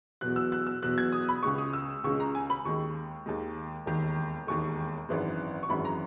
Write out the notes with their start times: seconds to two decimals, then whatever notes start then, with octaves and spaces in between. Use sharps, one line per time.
0.21 E2 B2 F#3 F#6
0.36 E6
0.52 F#6
0.67 E6
0.83 E2 B2 F#3 F#6
0.98 G#6
1.12 D#6
1.29 B5
1.43 C#2 C#3 G#3 C#6
1.58 D#6
1.73 E6
2.04 C#2 C#6
2.07 C#3 G#3
2.20 A#5
2.35 G#5
2.50 B5
2.65 D#2 D#3 G#3 C#6
3.26 D#2 D#3 G#3
3.86 E1 D#2 D#3
4.47 E1 D#2 D#3 C#6
5.09 G#1 F#2 E3 G#3
5.63 C#6
5.69 G#1 F#2 E3 G#3 B5
5.85 A#5